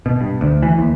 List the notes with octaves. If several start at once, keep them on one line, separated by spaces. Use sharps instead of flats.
B2
G2
D2
E3
D#2